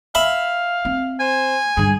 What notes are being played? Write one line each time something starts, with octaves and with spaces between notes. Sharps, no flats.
E5 F5 B5
C4
C5 G#5
G2 D3 G#4